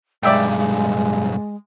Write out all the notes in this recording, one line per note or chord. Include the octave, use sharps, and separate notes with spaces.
B1 G2 G#3 D5 E5 G5